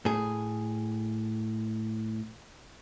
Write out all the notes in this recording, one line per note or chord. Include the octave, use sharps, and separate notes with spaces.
A2 G#4